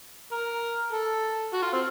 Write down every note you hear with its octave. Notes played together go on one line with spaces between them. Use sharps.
A#4
A4
F#4
F4
C4